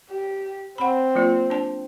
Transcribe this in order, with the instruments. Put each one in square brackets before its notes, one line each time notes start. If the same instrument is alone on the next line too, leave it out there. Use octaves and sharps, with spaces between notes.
[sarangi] G4
[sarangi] C4 [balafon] F#5 B5
[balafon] F#3 A#3 F4
D4 A5